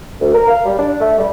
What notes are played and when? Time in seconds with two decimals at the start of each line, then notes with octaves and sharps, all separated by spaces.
0.21 D2
0.34 A#4
0.48 F5
0.65 G3
0.78 D4
1.00 A3
1.18 G3